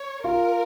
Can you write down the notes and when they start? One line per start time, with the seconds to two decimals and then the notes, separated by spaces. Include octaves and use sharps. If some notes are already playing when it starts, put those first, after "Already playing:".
Already playing: C#5
0.24 F4 A#4